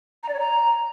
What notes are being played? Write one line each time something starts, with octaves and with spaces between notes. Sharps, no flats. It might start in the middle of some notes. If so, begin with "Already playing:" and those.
A#5
D5
C#5
A#5